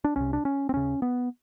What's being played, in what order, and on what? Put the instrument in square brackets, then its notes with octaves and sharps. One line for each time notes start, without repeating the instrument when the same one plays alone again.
[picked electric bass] D4
C2 C3 C#4
D4
C#4
C4
D#2 C#3 C#4
B3